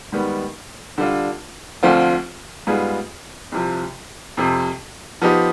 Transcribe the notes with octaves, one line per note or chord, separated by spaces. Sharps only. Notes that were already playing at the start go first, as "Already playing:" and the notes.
G#2 D#3 G3 B3
D3 G3 D4 F4
D2 D3 F3 C4 F4
G#2 G3 B3 F4 G#4
C2 C3 F3
F2 C3 F3
F3 B3 D#4 G4